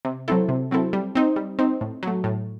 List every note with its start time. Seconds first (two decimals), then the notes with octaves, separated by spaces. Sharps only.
0.05 C3
0.28 F#3 C4 E4 A4
0.49 C3
0.71 F#3 C4 E4 A4
0.93 G3
1.15 C4 D#4
1.36 G3
1.59 C4 D#4
1.81 A2
2.03 F#3 A3
2.24 A2